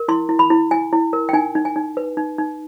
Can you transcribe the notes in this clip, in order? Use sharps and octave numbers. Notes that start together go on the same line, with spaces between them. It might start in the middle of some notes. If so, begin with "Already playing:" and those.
Already playing: A#4
E4 C6
E4
B5
E4
E4 G#5
E4
A#4
G5
D#4 G#5
D#4
G#5
D#4
B4
D#4
D#4